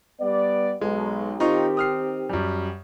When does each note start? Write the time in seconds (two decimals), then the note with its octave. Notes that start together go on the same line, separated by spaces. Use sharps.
0.21 G3 B3 D5
0.81 B1 G#3
1.40 D#3 C4 D#4 F4 G4 C#6
1.77 D#6 F6 C7
2.29 F#2 G3